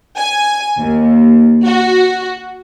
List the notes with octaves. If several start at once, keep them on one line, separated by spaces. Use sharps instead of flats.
G#5
D#2
F#4